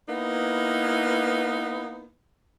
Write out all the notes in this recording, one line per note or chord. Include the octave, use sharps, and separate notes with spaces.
A#3 B3 D#4 E4 B4